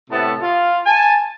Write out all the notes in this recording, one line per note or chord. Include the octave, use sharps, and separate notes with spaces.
A2 C3 A3 B3 A4 A5
F4
G#5 A5